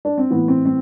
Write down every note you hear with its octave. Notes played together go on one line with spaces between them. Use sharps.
D4
C4
A2 E3 B3
C4
C4